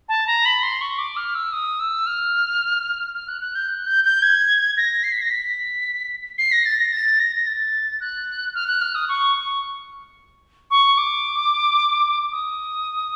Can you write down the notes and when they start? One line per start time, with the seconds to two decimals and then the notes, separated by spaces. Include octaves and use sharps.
0.08 A5
0.27 A#5
0.45 B5
0.62 C6
0.81 C#6
0.98 D6
1.16 F6
1.35 E6
1.52 D#6
1.80 E6
2.06 F6
3.15 F6
3.28 F#6
3.41 F#6
3.55 G6
3.69 F#6
3.87 G6
4.04 G6
4.22 G#6
4.77 A#6
5.03 C7
5.12 B6
5.21 A#6
5.30 B6
6.38 C7
6.52 A#6
6.66 A6
6.78 A#6
6.93 A6
7.20 A#6
7.36 A#6
7.47 A6
8.01 F#6
8.55 F6
8.67 F#6
8.81 F6
8.95 D#6
9.09 C#6
9.36 C#6
10.71 C#6
10.97 D6
12.32 D#6